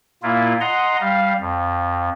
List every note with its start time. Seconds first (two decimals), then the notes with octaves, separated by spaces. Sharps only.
0.23 A#2 A#3 E4 F4
0.61 D#5 F#5 A#5 C6
1.00 G3 F5
1.40 F2